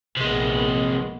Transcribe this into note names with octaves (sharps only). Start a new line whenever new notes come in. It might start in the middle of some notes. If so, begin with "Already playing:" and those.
A#1 C3 G#3 B3